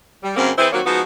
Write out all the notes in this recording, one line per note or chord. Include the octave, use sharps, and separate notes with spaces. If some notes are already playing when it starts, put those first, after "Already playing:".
G3
F#2 C#3 A#3 C4
E3 C4 E4 G#4 B4 C5
D#3 F#3 A#3 C4 F#4 C#5
F3 G#3 B3 D#4 F#4